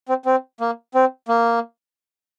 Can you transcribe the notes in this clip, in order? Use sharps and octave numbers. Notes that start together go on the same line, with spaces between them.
C4
C4
A#3
C4
A#3